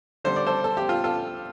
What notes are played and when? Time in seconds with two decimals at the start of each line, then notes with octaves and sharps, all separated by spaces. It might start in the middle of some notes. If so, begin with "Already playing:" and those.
0.24 D3 G3 C5
0.36 D5
0.47 A4 C5
0.64 A4
0.77 G4
0.89 F4 A4
1.04 F4 A4